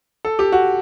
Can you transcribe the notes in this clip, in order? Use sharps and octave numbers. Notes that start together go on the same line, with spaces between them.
A4
G4
F#4